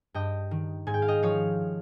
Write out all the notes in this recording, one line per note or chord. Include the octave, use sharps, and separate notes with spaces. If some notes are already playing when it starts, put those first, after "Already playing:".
G2 D#5 G5
D#3
G#2 G#5
G5
F5
D#5 G5
F3 C#5 F5